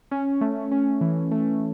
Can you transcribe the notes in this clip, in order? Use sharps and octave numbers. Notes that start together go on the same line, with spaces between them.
C#4
A3
C#4
E3
A3